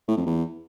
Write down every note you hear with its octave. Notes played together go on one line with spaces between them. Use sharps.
A2
F2
E2